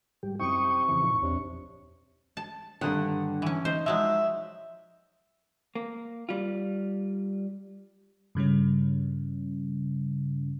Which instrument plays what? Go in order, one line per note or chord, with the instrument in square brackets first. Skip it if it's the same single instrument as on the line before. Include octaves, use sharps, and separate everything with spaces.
[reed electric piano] G#2 [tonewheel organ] G3 G4
[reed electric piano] F#2 D#4 E4 [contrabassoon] C3 [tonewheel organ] G5 D#6 [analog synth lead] C#6
[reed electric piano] F2 C#3 E3
[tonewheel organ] A#2 D#4 [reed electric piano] F3
[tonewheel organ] E2 [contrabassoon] C3 [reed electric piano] D4 C#5
[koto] A5
[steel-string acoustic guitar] G2 D3 F#5 [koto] D#3
[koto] E3 C#4
[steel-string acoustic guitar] D#4 [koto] C5
[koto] F3 F#3 G#3 [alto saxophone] E5
[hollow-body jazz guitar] A#3
G3 F4
[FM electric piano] G2 C#3 G3 C#4